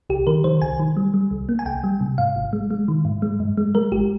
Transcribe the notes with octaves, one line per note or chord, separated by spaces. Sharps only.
C2 G4
D#3 A#4
D#3 C5
C2 G#5
D#3
G3
G3
C2
A#3
G#5
C2 G5
G3
C3
G#2 F5
G#1
G#3
G#3
D#3
G#2
G#3
G2
G#3
G#3 A#4
G#1 G4